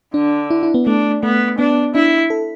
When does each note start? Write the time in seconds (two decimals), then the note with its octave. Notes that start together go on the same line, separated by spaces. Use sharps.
0.14 D3 D4
0.50 E4
0.63 E4
0.74 B3
0.86 A3 D4
1.23 A3 B3
1.58 B3 D4
1.95 D4 E4
2.30 A4